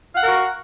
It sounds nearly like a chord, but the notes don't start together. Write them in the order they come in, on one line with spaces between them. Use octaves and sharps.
F5 F#5 A#4 F#4